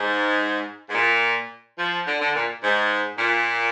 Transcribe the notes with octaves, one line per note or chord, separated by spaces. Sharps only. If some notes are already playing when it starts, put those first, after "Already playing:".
Already playing: G#2
G#2
A#2
F3
D3
D3
A#2
G#2
A#2